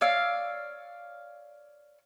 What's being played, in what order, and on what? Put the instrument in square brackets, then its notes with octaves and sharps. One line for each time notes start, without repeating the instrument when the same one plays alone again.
[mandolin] C#5 D5 F5 E6